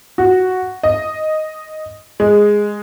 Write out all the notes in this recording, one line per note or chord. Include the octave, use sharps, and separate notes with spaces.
F#4
D#5
G#3